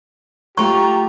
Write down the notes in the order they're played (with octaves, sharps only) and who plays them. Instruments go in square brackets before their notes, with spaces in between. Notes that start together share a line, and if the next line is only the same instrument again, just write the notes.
[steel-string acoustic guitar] F#3 A3 F4 [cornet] G4 [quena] A#5 [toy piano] C#6